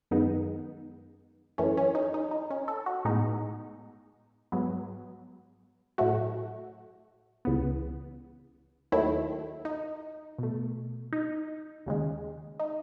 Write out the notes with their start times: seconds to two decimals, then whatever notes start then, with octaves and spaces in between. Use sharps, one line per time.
0.11 F#2 D#3 G#3 B3 D#4
1.58 F#2 E3 A3 C#4
1.77 C#4
1.95 D#4
2.14 D#4
2.31 D#4
2.50 C#4
2.68 A4
2.86 F#4
3.05 A2 G#3 B3 D#4
4.52 G#2 F#3 B3
5.98 A2 F#3 A3 F#4
7.45 C#2 C#3 E3 B3
8.92 D#2 D#3 F#3 A3 E4
9.65 D#4
10.39 B2 A3
11.13 D#4
11.86 D#2 C#3 G#3
12.59 D#4